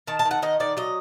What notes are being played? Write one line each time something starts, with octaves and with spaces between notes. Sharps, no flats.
D#3 A5
A5
D#3
F#5
D#3 D#5
D#3 D5
F#3 D#5